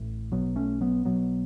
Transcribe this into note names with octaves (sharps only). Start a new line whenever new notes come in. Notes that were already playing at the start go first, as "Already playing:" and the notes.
Already playing: A1 A2
B1 B2 F#3 B3
A3 C#4
F#3 B3
B1 B2 F#3 B3